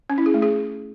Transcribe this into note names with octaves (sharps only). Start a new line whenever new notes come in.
C#4
E4
G#4
A3
G#4